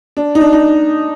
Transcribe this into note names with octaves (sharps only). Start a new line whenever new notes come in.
D4
D#4
D4
D#4